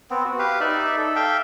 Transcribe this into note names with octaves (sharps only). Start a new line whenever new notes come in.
B3 C4
F#4
G4 B4 F5
D#4 D5 E5
A4
E5 F5 G5